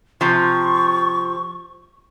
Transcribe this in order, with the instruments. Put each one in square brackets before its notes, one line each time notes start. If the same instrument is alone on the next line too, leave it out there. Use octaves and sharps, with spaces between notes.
[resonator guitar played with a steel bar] C3 F3 [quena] C#6